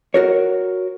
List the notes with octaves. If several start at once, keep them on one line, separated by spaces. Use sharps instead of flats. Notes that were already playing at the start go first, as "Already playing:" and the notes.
F#4 A#4 C#5